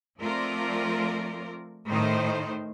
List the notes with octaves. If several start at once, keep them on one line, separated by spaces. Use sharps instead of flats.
F3 A3 C4 F4 A#4 D5
A2 D#3 D#4 C5